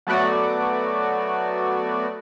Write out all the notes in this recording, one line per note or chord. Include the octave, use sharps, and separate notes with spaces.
F#3 A3 B3 F#4 D5